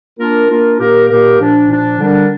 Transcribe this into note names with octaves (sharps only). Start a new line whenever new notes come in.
A#3 D4 F4 A#4
A#3 D4 F4 A#4
A#2 A#3 G4 A#4
A#2 A#3 G4 A#4
A#2 F3 D4
A#2 F3 D4
D3 G3 D4 A#4